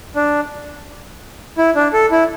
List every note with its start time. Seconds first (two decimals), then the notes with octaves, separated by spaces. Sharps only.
0.16 D4
1.58 E4
1.76 D4
1.93 A4
2.11 E4